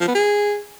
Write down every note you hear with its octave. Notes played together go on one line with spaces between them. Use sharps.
F3
B3
G#4